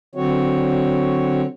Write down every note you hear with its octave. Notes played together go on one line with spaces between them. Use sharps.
D3 F#3 C4 F#4 C#5